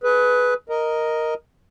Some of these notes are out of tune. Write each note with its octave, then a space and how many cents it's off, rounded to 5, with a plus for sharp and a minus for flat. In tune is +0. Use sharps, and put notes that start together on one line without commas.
G#4 +30 B4 +0
A#4 +0 D#5 +0